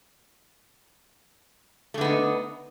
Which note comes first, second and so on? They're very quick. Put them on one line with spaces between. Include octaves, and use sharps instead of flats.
A3 D3 B3 D#4